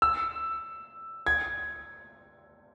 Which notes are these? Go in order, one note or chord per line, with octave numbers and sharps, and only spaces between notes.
E6
G#6